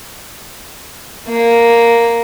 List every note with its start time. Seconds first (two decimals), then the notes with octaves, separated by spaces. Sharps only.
1.29 A#3